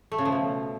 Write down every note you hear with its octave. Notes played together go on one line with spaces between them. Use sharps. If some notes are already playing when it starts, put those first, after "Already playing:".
A3
C#3
F3
B2